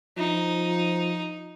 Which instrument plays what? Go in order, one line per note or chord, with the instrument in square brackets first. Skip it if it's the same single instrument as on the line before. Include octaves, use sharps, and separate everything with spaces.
[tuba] F3 [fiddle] D#4